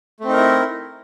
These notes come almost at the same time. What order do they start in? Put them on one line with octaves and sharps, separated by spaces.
A3 C4 D#4 A#4 E4